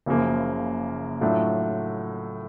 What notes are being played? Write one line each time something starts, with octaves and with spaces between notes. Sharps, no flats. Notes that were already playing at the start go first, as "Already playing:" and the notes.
F#1 F#2 C#3 F3 A#3
A2 F#3 A3 D4 F4